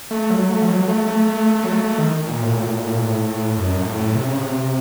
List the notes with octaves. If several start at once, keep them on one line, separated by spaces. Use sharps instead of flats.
A3
F#3
A3
F3
F#3
A3
A3
A3
A3
F#3
A3
A3
D#3
A#2
A2
A#2
A2
A#2
A2
A#2
A2
A#2
A2
F#2
A#2
A2
C3
C#3
C3